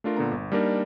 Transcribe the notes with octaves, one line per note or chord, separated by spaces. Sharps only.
A3 D4 F4 A#4
A#2 D3 B3 A#5
G1
G3 A#3 D4 D#4 A#4 D5